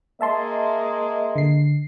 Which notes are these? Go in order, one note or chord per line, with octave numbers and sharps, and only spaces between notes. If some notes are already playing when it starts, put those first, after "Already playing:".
G#3 A#3 D#5 E5 A5 C6
D3 C7